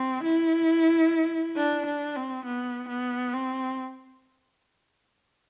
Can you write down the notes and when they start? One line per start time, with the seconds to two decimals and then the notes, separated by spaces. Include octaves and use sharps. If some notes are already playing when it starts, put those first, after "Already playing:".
Already playing: C4
0.23 E4
1.56 D4
1.86 D4
2.16 C4
2.45 B3
2.89 B3
3.33 C4